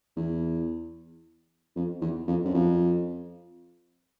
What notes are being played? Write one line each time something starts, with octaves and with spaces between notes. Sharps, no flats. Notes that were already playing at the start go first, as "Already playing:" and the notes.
E2
F2
E2
F2
F#2
F2